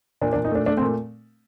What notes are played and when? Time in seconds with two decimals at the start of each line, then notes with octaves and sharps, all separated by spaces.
0.21 A#2 D4
0.33 D4
0.36 A#2
0.45 D#4
0.51 A3 D4
0.66 A3 D4
0.77 C4
0.82 A#2